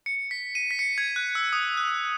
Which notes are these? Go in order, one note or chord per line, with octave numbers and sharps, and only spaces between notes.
C#7
B6
D#7
B6
C#7
G#6
F#6
E6
D#6
F#6